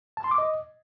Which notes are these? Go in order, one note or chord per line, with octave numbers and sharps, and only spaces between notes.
A5
C6
D6
D#5